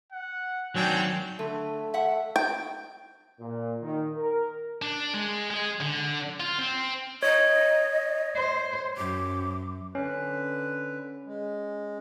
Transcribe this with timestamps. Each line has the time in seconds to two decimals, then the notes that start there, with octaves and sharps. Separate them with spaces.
0.12 F#5
0.75 D#3 F#3 C4 D4 F#4 G5 G#5
1.39 D3 A3
1.94 E5 F#5
2.36 G5
3.40 A#2
3.81 D#3
4.16 A#4
4.82 D4
5.14 G#3
5.50 G#3 G#4
5.80 D3
6.40 F4
6.58 C4
7.23 C#5 D#5
8.35 C5
8.97 F#2 D6
9.95 D3 C#4 B4
11.25 G#3